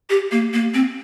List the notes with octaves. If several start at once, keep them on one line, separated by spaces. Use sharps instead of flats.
G4
A#3
A#3
C4